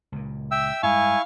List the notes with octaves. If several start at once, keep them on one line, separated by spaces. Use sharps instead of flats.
C#2 A#2
E5 G5 E6
G2 G#3 E4 F5 G#5 C#6